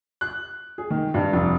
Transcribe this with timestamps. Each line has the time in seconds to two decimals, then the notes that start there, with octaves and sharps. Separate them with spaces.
0.21 F#6
0.78 G#4
0.91 D#3
1.14 G2
1.33 F1